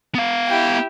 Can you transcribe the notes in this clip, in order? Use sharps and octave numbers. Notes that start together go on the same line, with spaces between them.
B3 F5
E4 G4